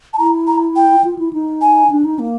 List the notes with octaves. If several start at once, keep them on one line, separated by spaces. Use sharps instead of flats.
A5
E4 A#5
A#5
G5
F4
E4
D#4
G#5
D4
D#4
A#3